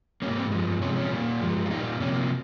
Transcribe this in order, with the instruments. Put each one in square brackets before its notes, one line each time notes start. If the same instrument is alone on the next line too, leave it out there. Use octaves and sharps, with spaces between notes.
[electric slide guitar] G#2 G3 A#3 C#4
C4
G2 F3 G#3
C3 F3 G#3 C#4
C#4
A#2 G3 A#3
G2 F3 G#3
F4
A#2 G3 A#3 D#4
C3 F3 A#3 C#4